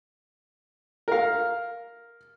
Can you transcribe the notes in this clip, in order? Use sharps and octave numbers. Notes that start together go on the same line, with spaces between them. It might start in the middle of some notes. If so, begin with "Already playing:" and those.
A#4 F5